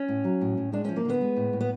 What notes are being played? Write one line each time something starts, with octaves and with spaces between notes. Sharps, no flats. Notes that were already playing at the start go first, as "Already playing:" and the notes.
Already playing: C#4
A2
F#3
A2
A2
G#3 D4
F3 C#4
A#3
D3 B3
G#3
A2
A2
B3